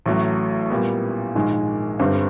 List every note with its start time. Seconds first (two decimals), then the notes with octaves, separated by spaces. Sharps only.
0.06 A1 A2 F#3 A3
0.70 A#2 G3 B3
1.35 A#1 G#2 D#3 G#3
1.99 G1 G2 D3 G3 C4